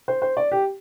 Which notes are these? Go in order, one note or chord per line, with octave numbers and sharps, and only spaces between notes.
C5
C5
D5
G4